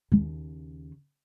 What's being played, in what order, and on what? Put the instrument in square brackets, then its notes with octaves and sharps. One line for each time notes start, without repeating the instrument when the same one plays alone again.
[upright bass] D#2 C#3